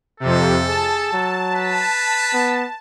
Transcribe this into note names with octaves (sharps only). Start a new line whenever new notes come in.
F2 C3 A4
G#4 A5
F#3
B4
B3